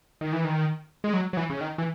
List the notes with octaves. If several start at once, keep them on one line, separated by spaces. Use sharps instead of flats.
D#3
E3
D#3
G#3
F#3
F#3
E3
C#3
D#3
E3